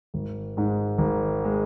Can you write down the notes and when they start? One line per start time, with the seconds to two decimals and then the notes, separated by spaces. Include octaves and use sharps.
0.14 G#1
0.57 G#2 G#3
0.98 G#1
1.45 G#3